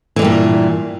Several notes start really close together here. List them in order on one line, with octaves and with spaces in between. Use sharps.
E3 D3 G2 A#2